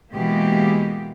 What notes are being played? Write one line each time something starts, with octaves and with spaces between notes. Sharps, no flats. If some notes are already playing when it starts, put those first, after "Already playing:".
B2 E3 G#3 A#3 G4